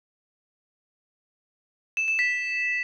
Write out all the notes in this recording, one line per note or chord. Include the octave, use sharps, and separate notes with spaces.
E7
E7
B6